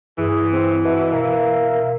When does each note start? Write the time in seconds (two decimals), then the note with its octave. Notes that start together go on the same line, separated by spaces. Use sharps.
0.18 G2 E3 G#4
0.51 C4
0.85 B2 E5
1.12 B2 A#3